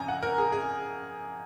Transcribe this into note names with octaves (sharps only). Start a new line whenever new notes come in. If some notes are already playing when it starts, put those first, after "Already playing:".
Already playing: F2 C#3 G#5 A#5
F#5
A#4
G#4
G#4